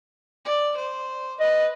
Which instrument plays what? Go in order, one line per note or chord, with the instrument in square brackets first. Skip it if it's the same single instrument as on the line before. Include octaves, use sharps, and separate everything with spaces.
[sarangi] D5
C5
[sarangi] B4 [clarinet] D#5